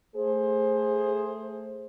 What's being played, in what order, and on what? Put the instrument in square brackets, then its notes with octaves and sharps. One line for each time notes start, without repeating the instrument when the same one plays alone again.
[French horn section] A3 G#4 C5